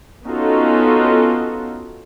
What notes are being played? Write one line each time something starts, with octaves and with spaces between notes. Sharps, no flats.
B3 C#4 D#4 F4 F#4 A4